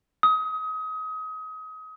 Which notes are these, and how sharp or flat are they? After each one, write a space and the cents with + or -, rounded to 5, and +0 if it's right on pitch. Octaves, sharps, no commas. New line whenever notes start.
D#6 +30